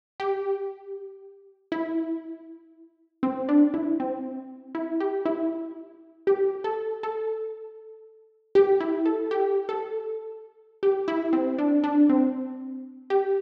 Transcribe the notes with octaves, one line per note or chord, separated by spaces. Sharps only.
G4
E4
C4
D4
E4
C4
E4
G4
E4
G4
A4
A4
G4
E4
A4
G4
A4
G4
E4
C4
D4
D4
C4
G4